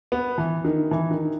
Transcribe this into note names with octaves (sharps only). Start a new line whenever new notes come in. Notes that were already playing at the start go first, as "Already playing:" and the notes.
B3
E3
D#3
E3
D#3